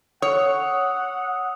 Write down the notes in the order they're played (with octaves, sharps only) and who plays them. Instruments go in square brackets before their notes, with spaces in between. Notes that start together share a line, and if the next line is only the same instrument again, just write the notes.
[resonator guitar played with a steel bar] C#5 [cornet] F#5 [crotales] D#6 E6